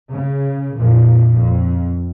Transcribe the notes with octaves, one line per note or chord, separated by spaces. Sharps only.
C#3
A#1 F2 A#2 F3
F2